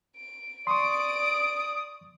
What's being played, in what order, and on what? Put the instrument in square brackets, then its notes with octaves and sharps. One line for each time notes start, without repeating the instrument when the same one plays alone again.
[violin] D7
[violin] D5 D7 [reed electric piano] C6 C#6 [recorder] D#6